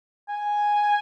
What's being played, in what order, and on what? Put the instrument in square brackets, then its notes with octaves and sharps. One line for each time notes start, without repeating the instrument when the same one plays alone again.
[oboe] G#5